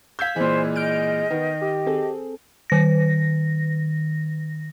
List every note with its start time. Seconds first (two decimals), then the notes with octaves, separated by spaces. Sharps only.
0.19 F5 E6 G6 G#6 B6
0.36 A#2 E3 G#3 C5
0.76 D#5 F6 G6 D7
1.30 D#3 B3
1.62 G4
1.86 C4 G#4 A4
2.70 D#3 A#6